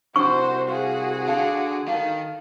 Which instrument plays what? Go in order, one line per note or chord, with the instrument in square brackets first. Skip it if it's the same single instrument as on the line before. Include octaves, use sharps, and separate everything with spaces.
[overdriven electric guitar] C2 [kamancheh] F#4 C5 [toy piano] C#6
[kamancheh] F#4 G#4 [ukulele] F5
[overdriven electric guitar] D3 [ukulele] F5 A5
[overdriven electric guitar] D#3 [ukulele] D#4 A4 F5